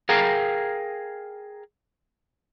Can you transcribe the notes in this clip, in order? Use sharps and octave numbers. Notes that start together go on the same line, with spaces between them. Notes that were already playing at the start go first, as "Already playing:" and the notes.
G#4 A#4 F5 G5 A#5